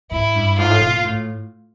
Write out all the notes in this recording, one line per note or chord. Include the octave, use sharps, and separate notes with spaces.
G#2 E4
G2
G#2 F4
A2
B2
A#2
A2